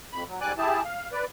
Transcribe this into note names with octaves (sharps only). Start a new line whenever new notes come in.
F2 B5
F#3
G#2 G3 D5 G#5 D6 F#6
E4 G4 G#4 A5
F5
B4 D5